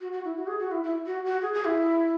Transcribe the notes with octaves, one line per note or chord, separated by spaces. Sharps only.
F#4
F#4
E4
F#4
G#4
F#4
E4
E4
F#4
F#4
G#4
G#4
E4